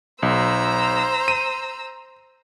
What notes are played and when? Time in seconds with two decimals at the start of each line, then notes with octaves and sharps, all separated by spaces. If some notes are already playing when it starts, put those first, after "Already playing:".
0.23 B1 C5 A#5 E6
1.28 D#7